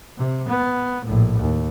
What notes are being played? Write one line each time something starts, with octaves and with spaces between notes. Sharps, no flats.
C3
B3
A#1 A2
D#2